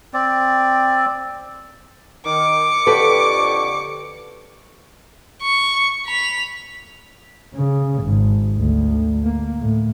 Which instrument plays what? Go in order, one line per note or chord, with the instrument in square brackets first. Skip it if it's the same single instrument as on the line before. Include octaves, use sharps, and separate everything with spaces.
[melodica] C4 D5
[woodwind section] D#3 [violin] D6 C#7
[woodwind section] F2 D3 C#6 [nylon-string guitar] G4 A4 B4
[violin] C#6
B5 F7
[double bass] C#3
G#1
D2
A#3
A2